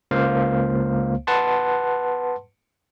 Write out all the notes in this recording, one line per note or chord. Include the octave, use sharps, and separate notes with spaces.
C#2 A#3 C5 F5
B4 F#5 A5 C6